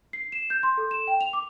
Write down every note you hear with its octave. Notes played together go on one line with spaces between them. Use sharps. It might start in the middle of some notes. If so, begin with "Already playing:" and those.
C7
E7
G6
C6
A4
E7
G5
F7
D6